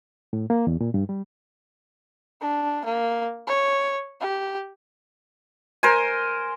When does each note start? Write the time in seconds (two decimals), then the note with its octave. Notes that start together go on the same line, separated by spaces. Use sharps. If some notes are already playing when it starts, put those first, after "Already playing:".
0.33 A2
0.50 A#3
0.67 E2
0.81 A#2
0.94 G2
1.09 G3
2.41 D4
2.85 A#3
3.47 C#5
4.20 G4
5.83 A#4 C5 G#5